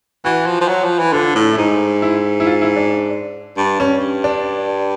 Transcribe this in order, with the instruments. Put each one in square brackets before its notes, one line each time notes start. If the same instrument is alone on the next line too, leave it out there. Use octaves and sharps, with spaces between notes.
[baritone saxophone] E3 [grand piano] F#4
[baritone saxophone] F3
F3
F#3
F3
E3
[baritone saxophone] D3 [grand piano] F4
[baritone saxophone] A2
[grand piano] E4
[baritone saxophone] G#2 [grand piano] D#4
[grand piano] E4
E4
F4
E4
D4
[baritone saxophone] G2
[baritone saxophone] G2 [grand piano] C#4
[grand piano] D4